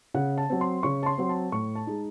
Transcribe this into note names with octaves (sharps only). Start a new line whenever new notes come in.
C#3 F#5
A5
F#3 C4
C6
C#3 C#6
A5
C6
F#3 C4
A5
A2 C#6
A5
G#3 D#4